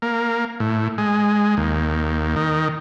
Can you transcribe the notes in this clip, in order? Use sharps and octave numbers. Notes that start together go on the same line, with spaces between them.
A#3
A2
G#3
D#2
D#3